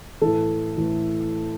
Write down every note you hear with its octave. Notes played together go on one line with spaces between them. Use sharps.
A2 E3 A4
A2 E3